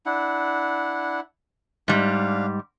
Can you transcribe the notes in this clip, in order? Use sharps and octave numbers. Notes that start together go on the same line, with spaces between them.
D4 E4 F#5
G#2 G3 D4 F5